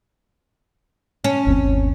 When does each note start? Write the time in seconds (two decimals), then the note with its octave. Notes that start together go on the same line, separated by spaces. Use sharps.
1.24 C#4
1.47 G1 D#2 C4